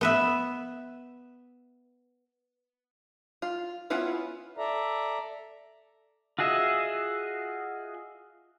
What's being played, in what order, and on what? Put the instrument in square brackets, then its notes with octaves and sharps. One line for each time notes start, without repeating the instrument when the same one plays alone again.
[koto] B3 B4 E5
[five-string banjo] F4
B3 C#4 E4 F4 B4
[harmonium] A4 D5 E5 A#5
[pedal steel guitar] F4 F#4 G#4 D#5 E5